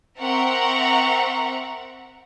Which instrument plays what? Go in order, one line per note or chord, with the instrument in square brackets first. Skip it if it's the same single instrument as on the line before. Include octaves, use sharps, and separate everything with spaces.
[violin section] C4 A#4 E5 F#5 A#5 C#6